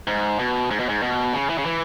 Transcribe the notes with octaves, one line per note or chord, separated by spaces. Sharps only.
G#2
B2
G#2
B2
G#2
B2
C#3
E3
C#3
E3